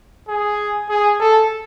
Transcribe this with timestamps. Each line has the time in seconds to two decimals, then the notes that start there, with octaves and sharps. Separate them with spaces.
0.29 G#4
0.90 G#4
1.21 A4